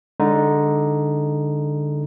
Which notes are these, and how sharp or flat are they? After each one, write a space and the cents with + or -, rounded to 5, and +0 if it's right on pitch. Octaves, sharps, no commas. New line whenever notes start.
D3 +0 G#3 -35 D#4 +0